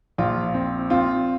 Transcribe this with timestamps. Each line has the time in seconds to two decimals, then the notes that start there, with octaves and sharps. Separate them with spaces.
0.18 A#1 F4
0.54 C4
0.90 C4 F4